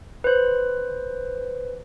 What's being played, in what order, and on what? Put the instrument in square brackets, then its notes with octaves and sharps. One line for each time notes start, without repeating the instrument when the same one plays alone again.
[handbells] B4 C5